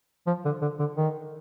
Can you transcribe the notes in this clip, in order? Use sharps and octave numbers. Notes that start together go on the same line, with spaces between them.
F3
D3
D3
D3
D#3